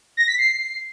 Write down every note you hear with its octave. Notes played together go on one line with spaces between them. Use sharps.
A#6
B6
C7